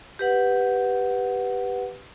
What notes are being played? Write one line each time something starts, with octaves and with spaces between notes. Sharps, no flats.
G4 B4 F#5